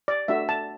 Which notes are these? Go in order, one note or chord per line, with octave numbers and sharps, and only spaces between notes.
D5
A3 D4 F#4 E5
A5